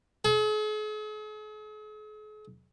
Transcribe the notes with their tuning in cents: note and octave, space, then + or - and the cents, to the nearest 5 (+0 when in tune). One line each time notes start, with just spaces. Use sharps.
G#4 +45